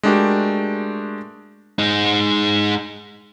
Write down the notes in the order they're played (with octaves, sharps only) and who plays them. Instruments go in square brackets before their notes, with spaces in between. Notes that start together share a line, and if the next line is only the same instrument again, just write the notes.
[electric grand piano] G#3 A3 D4 F#4 G4 A#4
[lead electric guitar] G#3 D#4